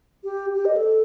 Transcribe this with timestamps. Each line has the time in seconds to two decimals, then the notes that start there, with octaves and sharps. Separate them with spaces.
0.24 G4
0.55 G4
0.65 D#5
0.76 A4